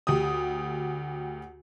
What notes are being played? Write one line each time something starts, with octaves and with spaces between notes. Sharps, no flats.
D2 G4 D#6